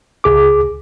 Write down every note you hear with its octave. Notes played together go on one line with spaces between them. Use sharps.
C#2 G#4 D6